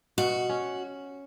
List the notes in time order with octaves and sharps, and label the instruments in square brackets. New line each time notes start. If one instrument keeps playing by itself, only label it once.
[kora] B2 [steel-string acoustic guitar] F#4
[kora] C#4